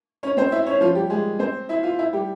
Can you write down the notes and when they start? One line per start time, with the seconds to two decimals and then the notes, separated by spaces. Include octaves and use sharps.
0.23 C#4 C#5
0.37 C4 C5
0.52 E4 E5
0.67 C#4 C#5
0.81 F3 F4
0.95 G3 G4
1.10 G#3 G#4
1.39 C4 C5
1.69 E4 E5
1.83 F4 F5
1.99 E4 E5
2.13 G3 G4